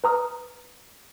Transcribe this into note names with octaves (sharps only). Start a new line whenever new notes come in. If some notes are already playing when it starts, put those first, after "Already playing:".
B4 A#5 D#6 F6